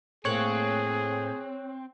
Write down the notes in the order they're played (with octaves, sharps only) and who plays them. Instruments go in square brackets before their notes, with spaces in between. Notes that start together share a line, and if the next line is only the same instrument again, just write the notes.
[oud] A2 A#3 [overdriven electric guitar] C4 [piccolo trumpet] G#4 [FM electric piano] C#5 F#6